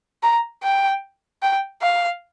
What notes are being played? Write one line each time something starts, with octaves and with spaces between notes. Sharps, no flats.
A#5
G5
G5
F5